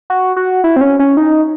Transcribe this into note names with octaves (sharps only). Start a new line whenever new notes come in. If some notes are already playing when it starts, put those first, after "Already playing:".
F#4
F#4
E4
C4
C#4
C#4
D#4